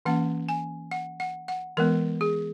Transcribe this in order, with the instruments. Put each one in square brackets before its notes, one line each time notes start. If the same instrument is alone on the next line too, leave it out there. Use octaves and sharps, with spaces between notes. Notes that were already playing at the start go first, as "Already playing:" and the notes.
[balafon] E3 A#3 C#4 F#5
G#5
F#5
F#5
F#5
E3 G#3 B3 A#4
G#4